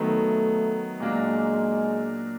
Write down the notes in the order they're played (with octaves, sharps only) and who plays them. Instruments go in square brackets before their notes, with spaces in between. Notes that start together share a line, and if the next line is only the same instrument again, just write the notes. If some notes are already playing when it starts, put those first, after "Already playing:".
Already playing: [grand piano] D#3 F#3 B3 [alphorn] A3
[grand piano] A#2 F#3 A#3 D4 [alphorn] G#3